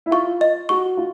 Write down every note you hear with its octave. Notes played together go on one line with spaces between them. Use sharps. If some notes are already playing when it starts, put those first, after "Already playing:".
E4
F4 C#6
D#5
F#4 C#6
F4